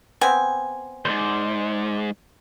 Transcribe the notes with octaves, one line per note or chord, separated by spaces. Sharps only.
B3 C4 G#5
D2 G#2 C5 D5